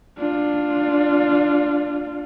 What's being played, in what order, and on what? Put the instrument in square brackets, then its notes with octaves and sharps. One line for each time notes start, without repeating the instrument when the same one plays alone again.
[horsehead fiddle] D4 F4